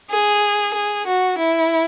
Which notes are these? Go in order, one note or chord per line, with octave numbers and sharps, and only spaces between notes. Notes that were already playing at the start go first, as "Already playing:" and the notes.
G#4
G#4
F#4
E4